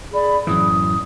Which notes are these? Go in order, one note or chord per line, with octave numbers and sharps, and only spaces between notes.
G#4 D5 B5
F#2 A2 E3 D#6